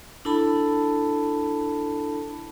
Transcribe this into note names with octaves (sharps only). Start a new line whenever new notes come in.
D4 E4 A4 A5 B5